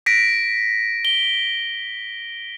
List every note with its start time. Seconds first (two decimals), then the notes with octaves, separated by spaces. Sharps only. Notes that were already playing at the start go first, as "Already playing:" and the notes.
0.06 A#6 B6 D7
1.05 G7